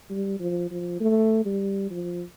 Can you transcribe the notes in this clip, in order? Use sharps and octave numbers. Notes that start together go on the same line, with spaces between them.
G3
F3
F3
A3
G3
F3